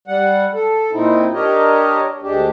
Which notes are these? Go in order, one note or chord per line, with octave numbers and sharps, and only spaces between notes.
G3 F#5
A4
A#2 C4 D#4 E4
D4 G4 A#4 C#5 D#5
D2 G#3 D4 G4